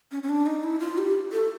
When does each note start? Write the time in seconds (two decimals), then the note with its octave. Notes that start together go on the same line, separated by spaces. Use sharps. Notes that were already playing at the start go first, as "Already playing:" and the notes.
0.12 C#4
0.23 C#4
0.29 D4
0.46 D#4
0.64 E4
0.80 F4
0.98 G4
1.32 A4